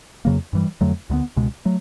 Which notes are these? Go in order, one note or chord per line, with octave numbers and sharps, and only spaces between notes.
F2 C#3 F#3 A#3
G2 E3 G3
F2 D3 F#3 A3
D2 D3 F#3 B3
C#2 B2 G#3
F#3 A3